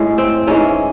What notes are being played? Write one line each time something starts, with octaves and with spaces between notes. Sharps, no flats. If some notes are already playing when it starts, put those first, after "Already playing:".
Already playing: A2 G#3
C4
G#2 E3 G#3 C#4